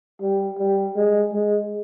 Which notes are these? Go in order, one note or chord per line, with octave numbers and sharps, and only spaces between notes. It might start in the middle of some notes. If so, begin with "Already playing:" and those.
G3
G3
G#3
G#3